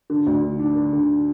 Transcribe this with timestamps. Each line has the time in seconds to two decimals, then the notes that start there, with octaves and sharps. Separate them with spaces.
0.10 D3
0.27 D2
0.43 D3
0.59 D4
0.75 D3
0.93 D3